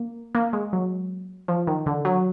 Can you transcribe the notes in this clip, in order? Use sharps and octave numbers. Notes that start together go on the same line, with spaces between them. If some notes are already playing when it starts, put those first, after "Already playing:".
Already playing: A#3
A#3
G#3
F#3
F3
D#3
D3
F#3